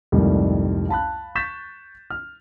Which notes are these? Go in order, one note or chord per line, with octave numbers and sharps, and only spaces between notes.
C2 F2 G#2 D#3 G3 A3
F5 A5 B5 F#6
C#6 G6 A6 B6 E7
F6